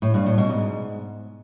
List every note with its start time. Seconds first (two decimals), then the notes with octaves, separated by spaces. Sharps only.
0.02 A2
0.14 G2
0.26 A2
0.38 B2
0.50 G#2